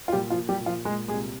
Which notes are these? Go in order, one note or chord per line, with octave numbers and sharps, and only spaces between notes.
F4
A#2 G3 G4
F3 F4
A#2
G3 G4
A#2
F3 F4
A#2 G#3 G#4
C2 G#3 G#4